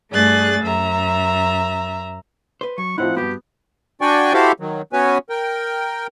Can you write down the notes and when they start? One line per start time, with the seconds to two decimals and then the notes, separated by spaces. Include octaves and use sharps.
0.12 G2 A3 G#4 D5 F#6 A6
0.62 F#2 E5 A#5
2.61 B4 C5
2.78 F#3 C#6
2.98 A2 F3 C4 D#4 E4 F#5
3.17 G2 B3 F#4 G4
4.01 D4 F#4 D5 G5 G#5 C#6
4.33 E4 F#4 G4 A4 C5 F5
4.60 D#3 F#3
4.93 B3 C#4 F#4 B4 C#5 G#5
5.30 A#4 G5